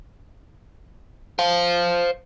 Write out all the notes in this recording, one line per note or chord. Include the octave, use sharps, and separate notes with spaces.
C5 F5